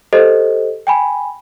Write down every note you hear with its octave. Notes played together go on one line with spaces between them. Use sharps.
G4 A4 C5 D#5
G5 G#5 B5